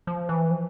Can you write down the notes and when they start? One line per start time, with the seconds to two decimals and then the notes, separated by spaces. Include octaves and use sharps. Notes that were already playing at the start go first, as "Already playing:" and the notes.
0.07 F3
0.29 E3
0.51 F3